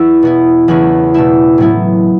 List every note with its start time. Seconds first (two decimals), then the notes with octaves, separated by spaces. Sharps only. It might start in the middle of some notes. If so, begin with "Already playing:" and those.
Already playing: E2 E4 C#6 E6
0.23 B2 B3 E4
0.68 E2 C#3 A3 C#4 E4 F#6
1.14 B2 A3 E4 E6
1.58 A2 F#3 B3 E4